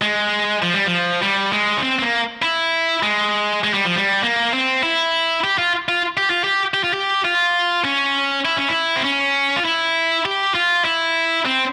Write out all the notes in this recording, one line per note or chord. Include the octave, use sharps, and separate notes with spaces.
G#3
F3
G3
F3
G3
G#3
C#4
C4
C4
A#3
E4
G#3
G#3
G3
F3
G3
A#3
C4
E4
G4
F4
F4
G4
F4
G4
G4
F4
G4
F4
C#4
E4
C#4
E4
C4
C#4
F4
E4
G4
F4
E4
C4